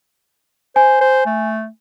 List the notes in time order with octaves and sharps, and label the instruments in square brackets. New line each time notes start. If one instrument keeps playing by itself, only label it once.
[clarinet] C5 [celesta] G#5
[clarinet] C5
A3